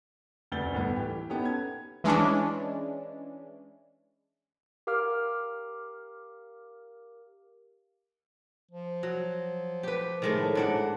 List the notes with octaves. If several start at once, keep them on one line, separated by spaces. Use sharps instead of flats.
F1 D2 G6 A6 G7
G1 A2 B3
E3 G4
B3 C#4 D#4 G4 A4
G#6
E3 G#3 C#4 D4
G4 A#4 F5 D6 F6
F3
F#3
G4 B4
A2 D#3 G#3 A3 C#5
G#2 D4 F#5